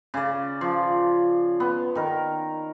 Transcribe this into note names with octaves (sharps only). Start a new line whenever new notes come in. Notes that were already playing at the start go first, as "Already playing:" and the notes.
C#3 D5
F3
B3
D#3 A#4